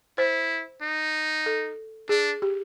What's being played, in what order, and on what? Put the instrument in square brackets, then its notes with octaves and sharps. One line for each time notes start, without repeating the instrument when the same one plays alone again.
[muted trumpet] E4 [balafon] C5
[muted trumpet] D#4
[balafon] A4
[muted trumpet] D4 [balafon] G#4
[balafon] G4